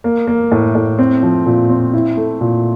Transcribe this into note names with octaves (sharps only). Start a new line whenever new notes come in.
A#3
A#3
A2
A2
C4
F3
A#2
C4
E4
A3
A#2